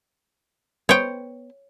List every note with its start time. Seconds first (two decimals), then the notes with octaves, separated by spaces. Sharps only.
0.89 B3 C5 C#5 G5